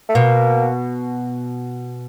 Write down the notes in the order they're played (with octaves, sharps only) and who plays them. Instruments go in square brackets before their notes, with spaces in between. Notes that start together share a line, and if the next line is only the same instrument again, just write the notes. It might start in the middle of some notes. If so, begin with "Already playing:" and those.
[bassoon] A3
[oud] B2 [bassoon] A#3